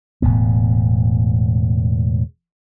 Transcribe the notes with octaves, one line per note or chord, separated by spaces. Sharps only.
E1 A2 B3